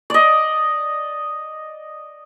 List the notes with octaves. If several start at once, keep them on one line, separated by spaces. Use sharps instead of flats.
D5 D#5